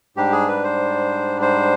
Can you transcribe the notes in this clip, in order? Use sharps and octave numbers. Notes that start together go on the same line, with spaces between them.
G#2 G3 D4 G4
G#4
B4
C5
C5